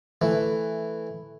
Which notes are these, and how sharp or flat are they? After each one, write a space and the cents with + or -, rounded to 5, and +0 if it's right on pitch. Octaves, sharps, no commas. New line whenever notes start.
E3 +0 A3 +0